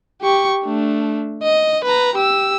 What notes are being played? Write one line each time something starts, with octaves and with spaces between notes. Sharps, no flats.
G4 C#6
A3 D4
D#5
B4 A#5
G4 E6